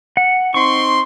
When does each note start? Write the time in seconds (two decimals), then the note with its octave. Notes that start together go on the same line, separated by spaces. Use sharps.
0.17 F#5
0.54 C4 D#4 C6 C#6